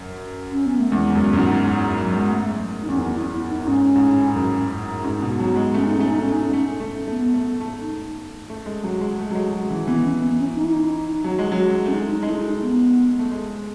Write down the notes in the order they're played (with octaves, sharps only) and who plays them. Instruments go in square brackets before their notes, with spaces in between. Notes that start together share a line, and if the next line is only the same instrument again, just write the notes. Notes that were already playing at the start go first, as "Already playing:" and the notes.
Already playing: [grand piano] F#2
[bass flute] C#4
B3
A3
[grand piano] E2 [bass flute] G#3
[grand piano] F#2
F#2
G#2
[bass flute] F#3
G#3
A3
D#4
[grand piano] E2 [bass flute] C#4
[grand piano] F#2 [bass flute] B3
[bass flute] E4
E4
D#4
[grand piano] G#2 [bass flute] C#4
[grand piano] G#2
A2
F#2
G#2
B2
F#3
G#3
[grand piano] A3 [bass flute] C#4
[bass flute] D#4
[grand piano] A3 [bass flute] C#4
[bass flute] D#4
C#4
[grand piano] A3 [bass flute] D#4
[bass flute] C#4
[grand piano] A3
A3
[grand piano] A3 [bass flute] B3
[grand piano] A3
A3
[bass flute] D#4
[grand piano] A3
G#3
F#3
G#3
A3
F#3
G#3
F#3
E3
[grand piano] E3 [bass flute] B3
[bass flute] C#4
B3
C#4
D#4
E4
D#4
[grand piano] F#3
G#3
F#3
[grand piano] A3 [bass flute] C#4
[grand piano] G#3 [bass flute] D#4
[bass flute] D#4
[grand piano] G#3
[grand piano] A3 [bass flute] E4
[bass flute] E4
D#4
B3
[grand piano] A3
G#3